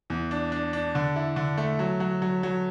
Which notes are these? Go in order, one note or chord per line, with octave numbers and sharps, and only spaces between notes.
E2
D4
D4
D4
D3
E4
D3
A3
F#3
F#3
F#3
F#3